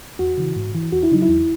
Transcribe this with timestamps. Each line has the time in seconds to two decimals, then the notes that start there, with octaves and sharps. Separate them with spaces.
0.19 E2 F#4
0.37 C#3 E3
0.56 G#2
0.75 E3
0.92 E2 F#4
1.03 E4
1.11 C#3 F#3 D#4
1.22 E4
1.29 E2